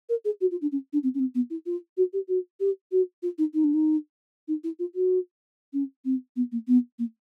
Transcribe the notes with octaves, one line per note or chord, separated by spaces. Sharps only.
A#4
G#4
F#4
F4
D4
C#4
D4
C4
C#4
C4
B3
E4
F4
F#4
G4
F#4
G4
F#4
F4
D#4
D#4
D4
D#4
D#4
E4
F4
F#4
C#4
C4
B3
A#3
B3
A#3